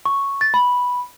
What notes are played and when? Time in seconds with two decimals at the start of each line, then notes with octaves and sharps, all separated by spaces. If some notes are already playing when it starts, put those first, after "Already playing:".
0.06 C#6
0.41 A6
0.54 B5